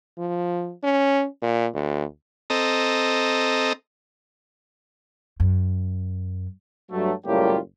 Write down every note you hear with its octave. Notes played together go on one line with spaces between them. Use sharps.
F3
C#4
A#2
D2
C4 A4 D#5 A#5
F#2
G2 F#3 A3
F#1 A2 G3 A#3 F4 G4